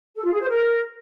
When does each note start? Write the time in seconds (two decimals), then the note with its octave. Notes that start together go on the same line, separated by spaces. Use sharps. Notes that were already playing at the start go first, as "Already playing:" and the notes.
0.16 A4
0.24 F4
0.32 G#4
0.40 C5
0.48 A#4